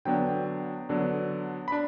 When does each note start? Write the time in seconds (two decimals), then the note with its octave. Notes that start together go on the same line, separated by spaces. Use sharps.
0.05 D3 F#3 B3 D4 G5
0.89 D3 F#3 B3 D4
1.68 B5
1.72 D4